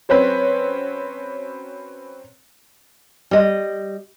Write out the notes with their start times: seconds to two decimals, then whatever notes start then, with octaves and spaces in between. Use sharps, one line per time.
0.09 F#3 C4 C#4 B4
3.31 G3 D#5